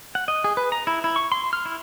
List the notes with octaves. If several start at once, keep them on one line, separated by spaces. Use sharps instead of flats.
F#5
D#5
G#4
B4
A#5
E4
E4
C#6
C6
F6
E4